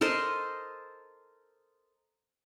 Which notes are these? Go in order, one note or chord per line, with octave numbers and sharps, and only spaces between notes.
A4 A#4 C5 D#5